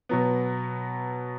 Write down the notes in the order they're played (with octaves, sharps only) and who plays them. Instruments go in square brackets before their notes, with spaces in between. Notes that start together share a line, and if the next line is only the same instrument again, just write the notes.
[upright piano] B2 F#3 B3